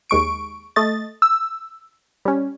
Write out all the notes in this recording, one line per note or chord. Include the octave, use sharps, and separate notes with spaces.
D#2 G#3 C#6 D7
A3 D#5 A6
E6
G3 C#4